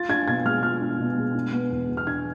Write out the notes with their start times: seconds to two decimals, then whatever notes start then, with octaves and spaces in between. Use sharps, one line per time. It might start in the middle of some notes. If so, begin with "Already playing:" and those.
Already playing: F4 A6
0.09 D4 G#6
0.27 B2 G#6
0.46 G#3 F6
0.63 F4 F6
0.81 D4
0.99 B2
1.17 G#3
1.34 D4
1.52 B3
1.71 E2
1.89 B2
1.97 F6
2.07 D4 G#6